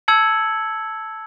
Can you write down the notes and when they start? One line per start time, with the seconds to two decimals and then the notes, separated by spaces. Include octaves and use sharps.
0.08 A5 E6 G#6 C#7 F#7